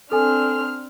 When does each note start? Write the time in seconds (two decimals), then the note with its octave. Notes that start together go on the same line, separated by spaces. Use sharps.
0.12 C4 D4 A4 G#5 F6